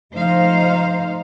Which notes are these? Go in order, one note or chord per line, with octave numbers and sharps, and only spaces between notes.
F3 A3 D#4 C5 F5